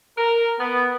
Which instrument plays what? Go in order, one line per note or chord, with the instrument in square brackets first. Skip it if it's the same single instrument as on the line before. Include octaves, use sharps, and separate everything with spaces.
[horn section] A#4
B3